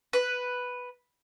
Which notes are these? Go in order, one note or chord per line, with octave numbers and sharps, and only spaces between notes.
B4